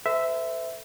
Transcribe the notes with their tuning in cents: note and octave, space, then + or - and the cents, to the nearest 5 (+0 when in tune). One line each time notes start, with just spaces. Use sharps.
A4 +35 C5 -40 E5 +0